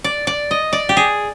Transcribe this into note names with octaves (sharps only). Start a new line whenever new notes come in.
D5
D5
D#5
D5
G4
G#4